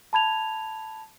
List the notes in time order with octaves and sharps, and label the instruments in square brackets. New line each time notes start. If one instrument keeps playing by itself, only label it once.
[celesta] A5 B5 G#6 F7